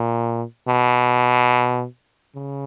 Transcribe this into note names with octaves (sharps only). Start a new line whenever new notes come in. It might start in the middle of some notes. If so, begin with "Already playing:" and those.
Already playing: A#2
B2
C#3